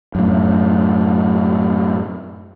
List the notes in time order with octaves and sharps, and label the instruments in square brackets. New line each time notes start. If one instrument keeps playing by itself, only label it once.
[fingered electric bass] F#2 A2